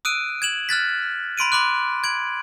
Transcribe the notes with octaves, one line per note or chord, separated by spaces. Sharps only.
D#6 E6 F#6 D7 D#7
G#6 E7 F#7
F6 F#6 A6 B6
B5 C6 D7 D#7
B5 C6 D6 F#6
G#6 D7 F#7